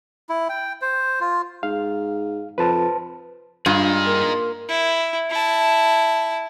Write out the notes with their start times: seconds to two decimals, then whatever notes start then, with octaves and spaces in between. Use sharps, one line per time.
0.29 E4
0.49 G5
0.82 C5
1.20 F4
1.63 G#2 F5
2.58 F2 B4 C5 A5
3.66 G2 D#4 F4 G#4
4.06 A#3
4.69 E4
5.30 E4 A5